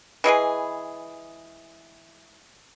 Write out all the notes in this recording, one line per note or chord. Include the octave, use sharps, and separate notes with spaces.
E3 G#3 G#4 B4